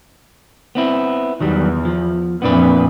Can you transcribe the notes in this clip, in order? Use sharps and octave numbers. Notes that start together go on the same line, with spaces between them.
B3 C4 E4
E2 D#3 F#3 G3
F3
F2 A#2 E3 B3 D4 B4